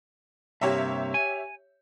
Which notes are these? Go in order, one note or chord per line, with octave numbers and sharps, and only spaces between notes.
G2 C3 A#3 G4 C#5 E5
G#5